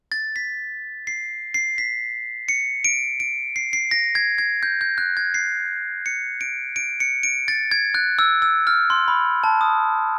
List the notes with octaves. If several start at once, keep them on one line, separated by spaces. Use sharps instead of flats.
A6
B6
C7
C7
B6
C#7
D7
D7
C7
C7
A#6
G#6
G#6
G6
G6
F#6
G#6
C7
C#7
D7
D7
C#7
D7
A6
G#6
F#6
E6
E6
F6
C6
B5
A5
D#6